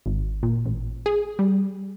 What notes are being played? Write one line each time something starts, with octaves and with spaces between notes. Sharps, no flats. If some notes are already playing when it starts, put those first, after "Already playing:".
G#1
A#2
A1
G#4
G3